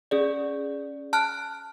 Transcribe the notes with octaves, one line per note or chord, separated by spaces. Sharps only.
C#4 G#4 D5
A5 F6 F#6